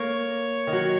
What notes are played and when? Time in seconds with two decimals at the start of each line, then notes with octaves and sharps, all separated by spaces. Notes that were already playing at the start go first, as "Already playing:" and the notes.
Already playing: A#3 C#5
0.67 D#3
0.73 F#3